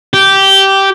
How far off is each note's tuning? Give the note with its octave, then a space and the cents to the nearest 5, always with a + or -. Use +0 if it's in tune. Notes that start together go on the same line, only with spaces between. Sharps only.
G4 -10